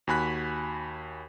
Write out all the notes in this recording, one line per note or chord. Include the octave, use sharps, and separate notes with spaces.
D#2 F#4 G#5 B5 F#6 B6